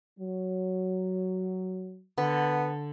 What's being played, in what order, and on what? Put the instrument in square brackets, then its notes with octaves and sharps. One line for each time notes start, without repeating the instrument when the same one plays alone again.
[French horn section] F#3
[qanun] D3 [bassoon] B3